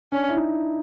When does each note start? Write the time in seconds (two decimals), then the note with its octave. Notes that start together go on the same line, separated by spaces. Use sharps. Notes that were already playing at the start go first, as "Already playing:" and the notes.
0.12 C#4 D4
0.29 E4
0.37 D#4